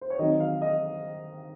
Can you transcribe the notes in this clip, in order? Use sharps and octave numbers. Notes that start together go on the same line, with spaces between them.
C5
C#5
D#3 F#3 C4 D#4 D#5
F5
D#5